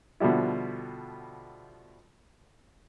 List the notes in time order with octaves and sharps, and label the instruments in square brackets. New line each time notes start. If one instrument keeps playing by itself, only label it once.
[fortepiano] B2 D3 F3 G3 E4